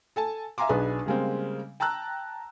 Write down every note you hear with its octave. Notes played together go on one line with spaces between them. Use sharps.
A4 G#5 A5
E5 F5 G#5 A#5 C6 D6
B1 D4 G#4 B4 G#5
C#3 G3 G#3 A#3 C4
G5 A5 A#5 E6 F#6